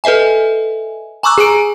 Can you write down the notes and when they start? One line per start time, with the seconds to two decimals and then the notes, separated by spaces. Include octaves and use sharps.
0.04 A4 B4 D#5 E5 G#5
1.23 G#5 A#5 C#6 D6 E6 F#6
1.38 G#4 G#5 A#5 D#6 D7